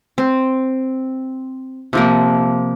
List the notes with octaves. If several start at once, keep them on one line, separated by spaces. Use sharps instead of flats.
C4
C3 F3 A#3